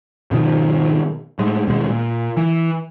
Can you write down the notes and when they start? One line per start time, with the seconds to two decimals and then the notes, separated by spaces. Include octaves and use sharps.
0.31 G#2 B2 D#3 F3
1.39 A2 G#3
1.67 D#2 B2 G#3
1.89 A#2
2.37 E3